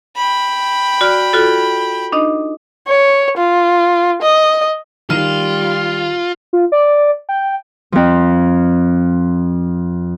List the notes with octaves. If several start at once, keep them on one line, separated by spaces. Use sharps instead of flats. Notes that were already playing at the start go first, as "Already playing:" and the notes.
G5 B5
F#4 D5 F6
F4 F#4 A4
D4 D#4 D#5
C#5
F4
D#5
D#3 G3 F4 F6 D#7
F4
D5
G5
F2 F3